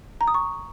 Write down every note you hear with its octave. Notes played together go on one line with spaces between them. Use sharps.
A#5
D#6
C#6